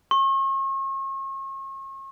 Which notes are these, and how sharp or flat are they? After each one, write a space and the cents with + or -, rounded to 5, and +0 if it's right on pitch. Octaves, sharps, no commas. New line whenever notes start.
C#6 -40